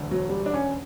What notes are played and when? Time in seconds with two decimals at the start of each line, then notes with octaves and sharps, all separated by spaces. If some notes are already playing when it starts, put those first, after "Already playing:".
Already playing: E1 D2 D3
0.11 F#3
0.29 G3
0.46 D4
0.54 C#4